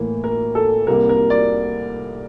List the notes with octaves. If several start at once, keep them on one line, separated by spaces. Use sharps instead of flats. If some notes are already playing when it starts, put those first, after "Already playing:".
Already playing: A2 E3 A#3
A#4
A4
C2 C3 G3 A#3 A#4
A#4
D5